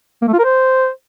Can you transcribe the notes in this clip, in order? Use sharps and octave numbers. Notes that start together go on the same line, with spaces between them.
A#3
A3
F4
A#4
C5